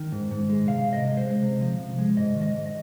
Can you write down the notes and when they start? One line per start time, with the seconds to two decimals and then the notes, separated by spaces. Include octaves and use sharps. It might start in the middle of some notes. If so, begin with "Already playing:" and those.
Already playing: D#3
0.12 G#2
0.31 G#2
0.49 G#3
0.68 C3 F5
0.87 C3
0.93 D#5
1.05 G#3
1.17 C5
1.24 G#3
1.42 C3
1.61 F3
1.79 C3
1.98 G#3
2.17 G#2 D#5
2.36 D#3
2.41 D#5
2.54 G#2
2.66 D#5